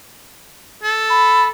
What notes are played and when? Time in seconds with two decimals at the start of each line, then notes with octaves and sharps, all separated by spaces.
0.83 A4
1.10 B5